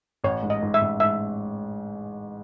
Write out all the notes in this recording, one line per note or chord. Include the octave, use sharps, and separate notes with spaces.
A1 C#5
G#2
D#5
G#2
E5
A1
G#2 E5